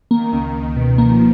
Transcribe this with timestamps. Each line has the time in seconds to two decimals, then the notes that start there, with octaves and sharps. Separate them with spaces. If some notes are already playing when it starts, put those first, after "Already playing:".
0.10 D#3 A#3
0.33 C#2
0.54 C#2
0.77 B2
0.98 F3 A#3